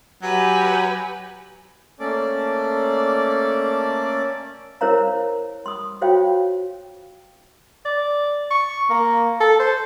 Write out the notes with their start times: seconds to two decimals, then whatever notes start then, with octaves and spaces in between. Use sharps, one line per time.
0.22 F#3 G4 B4 G#5
2.00 A3 A#3 C#4 A4 D5 D6
4.81 E4 A#4 C5 C#5 F5 A#5
5.66 C6 D#6
6.01 F4 F#4 C5 C#5 F5 G5
7.85 D5
8.51 C#6
8.90 A#3
9.40 A4
9.59 C5